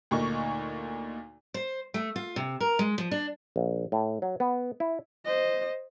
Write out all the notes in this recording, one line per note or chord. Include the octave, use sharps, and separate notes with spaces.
D2 A#2 D#4 C#6
C5
A3
F4
C3
A#4
G#3
F3
D4
A#1
A2
F#3
B3
E4
C5 D#5